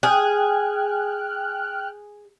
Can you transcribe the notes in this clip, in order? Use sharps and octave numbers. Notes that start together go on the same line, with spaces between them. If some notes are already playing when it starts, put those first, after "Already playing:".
G#4 G5 F6 F#6